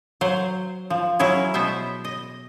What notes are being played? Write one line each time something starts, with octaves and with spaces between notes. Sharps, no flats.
F#3 C5
F3
F#3 C#4 E4 G#4
B2 B3 C5 E5
D#5